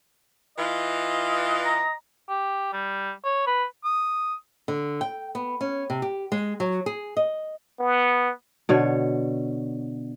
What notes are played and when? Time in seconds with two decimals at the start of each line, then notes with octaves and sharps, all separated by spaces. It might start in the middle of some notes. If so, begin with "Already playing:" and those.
0.57 E3 F4 D#5
1.65 A#5
2.29 G4
2.73 G3
3.24 C#5
3.47 B4
3.85 D#6
4.68 D3
5.01 G5
5.35 B3
5.61 C#4
5.90 C3
6.02 G4
6.32 G#3
6.60 F#3
6.86 G#4
7.17 D#5
7.79 B3
8.69 B2 D3 C#5